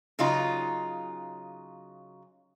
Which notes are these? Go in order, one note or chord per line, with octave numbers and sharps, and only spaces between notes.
C#3 F#3 D#4 F4 A#5